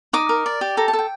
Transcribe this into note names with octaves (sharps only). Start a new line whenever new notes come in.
D#4 D6
A#4
D5
G4
A4 A#5
A5
A4
G5